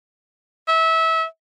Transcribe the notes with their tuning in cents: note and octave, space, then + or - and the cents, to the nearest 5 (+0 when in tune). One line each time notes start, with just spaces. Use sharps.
E5 -25